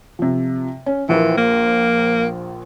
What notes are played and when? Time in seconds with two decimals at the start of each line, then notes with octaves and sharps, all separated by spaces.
0.19 C3 F3
0.86 C#4
1.09 A#1 E3 F4 A#4
1.37 A#3